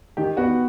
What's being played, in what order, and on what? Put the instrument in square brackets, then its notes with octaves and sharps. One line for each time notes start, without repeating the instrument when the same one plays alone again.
[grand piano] D#3 [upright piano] G4
[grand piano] B3 [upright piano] F#4